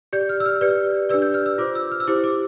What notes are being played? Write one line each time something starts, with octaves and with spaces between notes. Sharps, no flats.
G4 D5 G6
F6
E6
F6
G4 B4 D5
D4 G4 B4 D5 E6
G6
F6
E6
F4 C5 D6
E6
F6
E6
E4 G4 C5 D6
D6